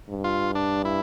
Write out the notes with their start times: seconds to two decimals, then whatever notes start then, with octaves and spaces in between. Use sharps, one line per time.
0.09 G2
0.24 F4
0.55 D4
0.85 E4